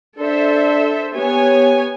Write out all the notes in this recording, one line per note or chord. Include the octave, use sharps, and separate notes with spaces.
D4 A4 C5 E5
B3 G4 C#5 G#5